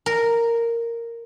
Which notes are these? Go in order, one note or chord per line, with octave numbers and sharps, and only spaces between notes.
A#4